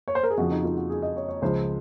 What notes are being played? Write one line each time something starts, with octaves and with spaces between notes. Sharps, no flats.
C#5
C5
A#4
G#4
F2 C#3 F3 F#4
D#4
F4
F#4
G#4
D#5
C#5
C#5
C#2 C#3 F3 C5